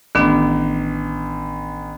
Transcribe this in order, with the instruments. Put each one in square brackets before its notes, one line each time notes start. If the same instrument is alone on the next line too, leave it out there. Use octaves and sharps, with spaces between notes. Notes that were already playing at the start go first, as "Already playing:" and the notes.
[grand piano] A1 [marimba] D#3 B3 D4